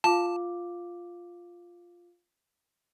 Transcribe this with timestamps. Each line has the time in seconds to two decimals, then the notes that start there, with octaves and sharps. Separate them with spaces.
0.04 F4 F5 A5 D6